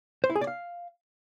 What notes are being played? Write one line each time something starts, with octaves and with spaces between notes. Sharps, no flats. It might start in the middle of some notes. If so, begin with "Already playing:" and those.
C5
E4
G#4
D5
F5